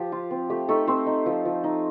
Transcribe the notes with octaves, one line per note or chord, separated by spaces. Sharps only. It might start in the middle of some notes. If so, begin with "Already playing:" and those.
Already playing: F3 G4
F4
C4
A3 G4
A3 D#4 A4
A3 C4 C5
D#4
F3
F3
D#4